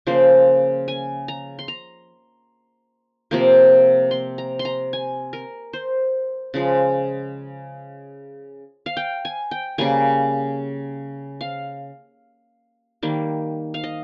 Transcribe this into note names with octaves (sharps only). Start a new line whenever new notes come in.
C#3 F3 A#3 C5
G#5
A#5
C6
A#5
C3 F3 A#3
C6
A#5
C6
A#5
G#5
A#4
C5
C#3 F3 G#3
F5
G5
G#5
G5
C#3 G3 A#3 G#5
F5
D#3 G3 A#3
F5
D#5